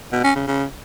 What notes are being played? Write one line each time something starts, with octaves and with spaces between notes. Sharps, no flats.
B2
C#4
C#3
C#3